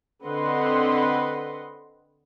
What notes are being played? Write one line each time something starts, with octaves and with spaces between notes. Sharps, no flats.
D3 C4 B4 D#5 F#5 C6